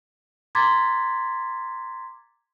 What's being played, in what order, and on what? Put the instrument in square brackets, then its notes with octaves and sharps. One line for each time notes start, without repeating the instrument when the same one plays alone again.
[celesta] A#5 C6 D6 G#6 A6 B6